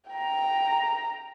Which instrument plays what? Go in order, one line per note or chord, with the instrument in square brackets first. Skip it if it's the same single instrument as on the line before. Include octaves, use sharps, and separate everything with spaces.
[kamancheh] G5 A#5